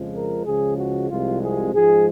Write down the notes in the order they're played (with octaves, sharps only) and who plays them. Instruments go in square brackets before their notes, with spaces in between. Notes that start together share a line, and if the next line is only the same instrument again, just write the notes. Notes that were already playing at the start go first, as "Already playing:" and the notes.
Already playing: [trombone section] F2 C#3 F3 G#3
A#4
C#2 C#3 F3 G#3 G#4
F#4
C2 C3 F3 G#3 F4
G#4
G#2 F3 G#3 G#4